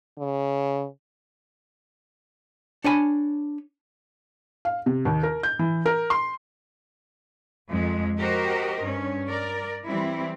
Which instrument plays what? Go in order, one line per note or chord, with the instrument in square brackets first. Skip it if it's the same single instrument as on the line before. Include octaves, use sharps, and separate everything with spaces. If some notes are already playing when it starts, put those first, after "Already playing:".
[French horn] C#3
[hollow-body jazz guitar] D4 C#5 G#5 B5
[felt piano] F5
C3
D#2
A#4
G6
E3
A#4
C6
[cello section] F2 G#3
F#4 G4 A#4 C5 D#5
G2 C#4
A#4 D5
E3 G3 C4 E4